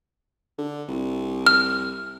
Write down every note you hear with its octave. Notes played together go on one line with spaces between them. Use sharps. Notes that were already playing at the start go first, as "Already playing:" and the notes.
D3
C2
F6